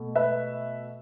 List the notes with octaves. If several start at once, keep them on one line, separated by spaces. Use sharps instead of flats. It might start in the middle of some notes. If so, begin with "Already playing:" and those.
Already playing: B2 A3
B4 E5